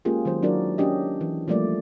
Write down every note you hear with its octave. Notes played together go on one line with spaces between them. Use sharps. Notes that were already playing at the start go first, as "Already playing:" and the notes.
G#3 A#3 C#4 F4 G4 G#4
D#3 F#3 F4 C5
F#3 D4 E4 F#4 A#4 D5
C#4 D4 G4 D#5
E3
F3 G3 A3 A#3 D5